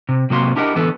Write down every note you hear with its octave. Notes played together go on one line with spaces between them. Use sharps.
C3
C3 F#3 A#3 F#4 F5 C6
D4 E4 G4 A#4 D#5 F#5
D3 E3 B3 A4 B4